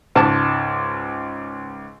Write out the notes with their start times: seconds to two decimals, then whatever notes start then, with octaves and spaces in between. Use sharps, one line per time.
0.15 C#2 G#2 A5